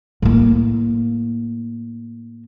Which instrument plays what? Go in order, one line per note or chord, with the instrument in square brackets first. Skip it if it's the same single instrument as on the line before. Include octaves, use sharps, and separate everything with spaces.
[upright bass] A2 A#3